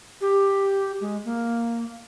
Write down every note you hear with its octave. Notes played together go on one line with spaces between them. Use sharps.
G4
G#3
A#3